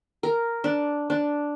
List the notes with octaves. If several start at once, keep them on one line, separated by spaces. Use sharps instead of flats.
A#4
D4
D4